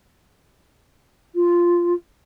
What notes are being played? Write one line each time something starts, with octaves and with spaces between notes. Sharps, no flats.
F4